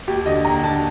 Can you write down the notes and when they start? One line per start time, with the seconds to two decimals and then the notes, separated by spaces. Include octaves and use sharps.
0.08 D#2 G4
0.26 D3 D#5
0.45 D#2 A#5
0.64 D3 A5